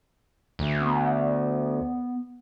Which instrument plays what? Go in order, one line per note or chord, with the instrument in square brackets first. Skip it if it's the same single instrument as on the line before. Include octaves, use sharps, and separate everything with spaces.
[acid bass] D2
[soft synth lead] B3